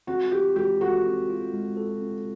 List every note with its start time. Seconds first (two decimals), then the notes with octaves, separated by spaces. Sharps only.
0.07 C4 F#4
0.31 F4 G4
0.56 G#3 G4
0.81 F#4 A4
1.05 C4
1.29 F4
1.53 G#3
1.77 A4
2.01 C4